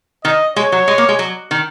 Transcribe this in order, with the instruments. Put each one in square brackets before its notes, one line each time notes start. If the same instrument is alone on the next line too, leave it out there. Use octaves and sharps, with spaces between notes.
[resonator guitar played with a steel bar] D#3 [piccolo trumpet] D#5
[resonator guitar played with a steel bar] G#3 [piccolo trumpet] C#5
[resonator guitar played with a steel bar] F#3
G#3
A#3
G#3
F#3
D#3